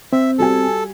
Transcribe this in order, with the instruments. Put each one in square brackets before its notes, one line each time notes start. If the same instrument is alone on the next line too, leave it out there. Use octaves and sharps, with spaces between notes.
[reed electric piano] C4 [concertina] E5
[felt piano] G3 F#4 G#5 [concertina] A4